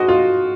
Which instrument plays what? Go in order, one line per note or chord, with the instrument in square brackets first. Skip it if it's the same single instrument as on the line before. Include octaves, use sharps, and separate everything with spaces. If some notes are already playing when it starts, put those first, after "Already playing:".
Already playing: [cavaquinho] D#4 G#4 C5 D#5 [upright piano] F#4
[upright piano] F4